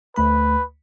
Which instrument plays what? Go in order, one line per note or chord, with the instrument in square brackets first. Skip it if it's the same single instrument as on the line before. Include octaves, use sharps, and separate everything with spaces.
[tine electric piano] D2 A3 B5 [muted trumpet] B4